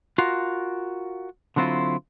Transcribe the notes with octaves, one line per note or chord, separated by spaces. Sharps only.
F4 F#4 A#4 F5
D3 F#3 C4 E4 F4